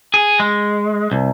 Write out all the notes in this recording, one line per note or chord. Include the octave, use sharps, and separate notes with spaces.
G#4
G#3
C2